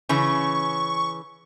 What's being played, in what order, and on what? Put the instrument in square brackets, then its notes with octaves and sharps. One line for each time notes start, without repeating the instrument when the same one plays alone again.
[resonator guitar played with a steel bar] C#3 E3 C#4 [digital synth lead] C#6